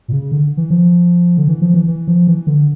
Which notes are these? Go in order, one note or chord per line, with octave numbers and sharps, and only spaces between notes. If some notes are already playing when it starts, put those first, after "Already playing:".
A#2
C#3
D3
E3
F3
D3
E3
F3
E3
E3
F3
E3
D3